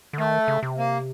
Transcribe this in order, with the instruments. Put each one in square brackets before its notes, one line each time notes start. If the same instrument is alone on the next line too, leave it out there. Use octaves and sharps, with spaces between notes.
[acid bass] D3
[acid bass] D#3 [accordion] A3
[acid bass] C#3
C3
[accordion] A#3